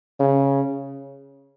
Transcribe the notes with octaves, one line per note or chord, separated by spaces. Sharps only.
C#3